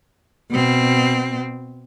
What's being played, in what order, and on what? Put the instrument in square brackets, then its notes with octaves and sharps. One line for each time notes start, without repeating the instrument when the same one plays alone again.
[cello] B2 C4